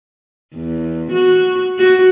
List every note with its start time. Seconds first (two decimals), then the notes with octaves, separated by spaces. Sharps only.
0.55 E2
1.12 F#4
1.79 F#4